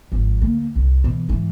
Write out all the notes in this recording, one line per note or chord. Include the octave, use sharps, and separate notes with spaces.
G#1 F3
D2 A#3
C2
B2 E3
G#2 E3